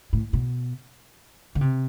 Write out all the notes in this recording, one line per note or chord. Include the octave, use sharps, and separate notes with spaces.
A2
B2
D3
C3